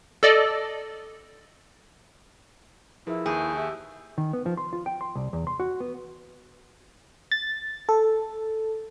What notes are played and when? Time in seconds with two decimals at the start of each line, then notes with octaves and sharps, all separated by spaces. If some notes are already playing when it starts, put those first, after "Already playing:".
0.23 A4 D5 D#5
3.07 F3 E4 G#4 A#4 B4
3.26 D#2 G#4 C#6 G6
3.56 G4 E5 E6
4.18 D#3
4.33 B3
4.46 F3
4.57 C6
4.73 F4
4.86 G5
5.01 C6
5.15 C2
5.33 E2
5.47 C6
5.60 F#4
5.80 B3
7.32 A6
7.89 A4